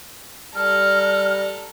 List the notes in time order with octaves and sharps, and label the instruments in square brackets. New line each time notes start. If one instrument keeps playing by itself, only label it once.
[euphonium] G3 [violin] A4 A#5 [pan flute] F6